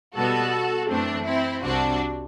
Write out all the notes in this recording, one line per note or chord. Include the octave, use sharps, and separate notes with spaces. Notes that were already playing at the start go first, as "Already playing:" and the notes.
B2 G3 B3 F#4 A4
F#2 E3 A3 C4 D4
C4 E4
C2 C3 G3 C4 D4 F#4